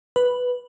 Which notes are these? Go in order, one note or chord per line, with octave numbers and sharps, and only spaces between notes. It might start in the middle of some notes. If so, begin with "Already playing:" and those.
B4